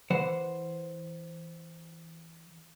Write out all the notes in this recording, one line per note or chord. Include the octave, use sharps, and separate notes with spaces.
E3 C5 F#5